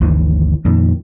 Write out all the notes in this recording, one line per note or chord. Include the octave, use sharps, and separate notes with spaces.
G1 D2 D#3 E3
F2 A#2 D#3